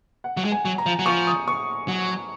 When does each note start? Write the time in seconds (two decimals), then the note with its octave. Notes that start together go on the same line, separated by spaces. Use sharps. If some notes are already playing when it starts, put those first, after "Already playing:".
0.24 F#5
0.37 F#3
0.45 G#3
0.52 G#5
0.65 F#3
0.78 A#5
0.86 F3
0.99 F#3
1.06 F3 C#6
1.27 D#6
1.48 C#6
1.88 F#3